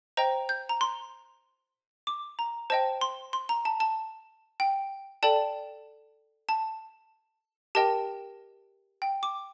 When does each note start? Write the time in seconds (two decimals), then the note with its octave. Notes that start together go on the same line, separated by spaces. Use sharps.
0.17 C5 D#5 G5 A#5
0.49 G6
0.69 A#5
0.81 C6
2.07 D6
2.39 A#5
2.70 C5 D#5 G5 A5
3.01 C6
3.33 C6
3.49 A#5
3.65 A5
3.80 A5
4.60 G5
5.23 A4 D5 G5 A5
6.49 A5
7.75 G4 A#4 D#5 G5 A5
9.02 G5
9.23 D6